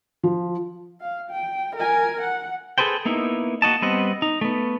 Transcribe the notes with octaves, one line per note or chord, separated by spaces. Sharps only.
F3
F5
G5
A#4 G#5
F#5
G#4 A4 B4 C5 G5
A#3 B3 D#4 E4
A#3 F#4 D#5 A5
G3 B3 C4 D#5 F#5
D#4
A3 B3